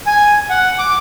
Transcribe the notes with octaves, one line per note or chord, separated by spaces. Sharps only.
G#5
F#5
D6